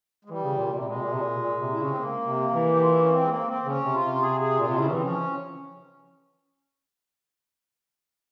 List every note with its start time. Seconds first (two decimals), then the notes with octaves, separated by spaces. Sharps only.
0.25 G#3
0.30 E3 G3
0.43 C#3
0.57 A#2
0.72 A#2
0.76 C3 G3
0.86 A#2 G#3
0.96 C3
1.04 A#2
1.13 C3
1.21 A#2
1.42 A#2
1.61 C3
1.72 E4
1.79 C#3 C#4
1.89 C4
1.97 A#3
2.26 C3
2.54 E3
2.72 G4
2.81 F4
2.91 E4
3.01 C#4
3.10 C4
3.21 G#3
3.28 A#3
3.47 C4
3.65 C#3 C#4
3.85 C3
3.94 F4
4.04 C3
4.22 G#4
4.40 G#4
4.59 A#2 F4
4.68 C3
4.78 C#3 E4
4.85 C#4
4.91 E3 C4
5.01 C#4
5.06 F3